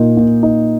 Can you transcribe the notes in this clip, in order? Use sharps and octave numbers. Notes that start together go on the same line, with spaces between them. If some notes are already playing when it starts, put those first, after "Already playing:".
Already playing: A#2 A#3 D#4
A#2
D#4